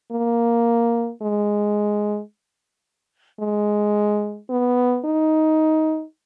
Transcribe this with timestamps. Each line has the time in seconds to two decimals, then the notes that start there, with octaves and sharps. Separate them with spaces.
0.12 A#3
1.22 G#3
3.40 G#3
4.50 B3
5.05 D#4